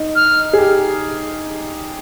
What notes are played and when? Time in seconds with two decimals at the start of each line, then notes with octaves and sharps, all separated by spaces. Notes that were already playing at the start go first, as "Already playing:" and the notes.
Already playing: D#4
0.16 F6
0.53 G#4
0.58 G4